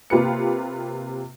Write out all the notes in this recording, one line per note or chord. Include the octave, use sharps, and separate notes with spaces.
C3 A#3 F4 G4 B4 C#7